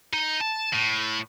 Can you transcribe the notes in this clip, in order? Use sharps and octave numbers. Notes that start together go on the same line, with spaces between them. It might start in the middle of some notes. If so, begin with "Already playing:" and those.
D#4
A5
A2